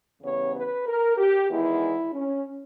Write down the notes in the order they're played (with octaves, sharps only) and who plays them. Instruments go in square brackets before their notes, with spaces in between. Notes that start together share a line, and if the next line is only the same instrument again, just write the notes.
[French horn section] E2 C#3 G3 B3 C#5
B4
A#4
G4
E2 D#3 G#3 B3 E4
C#4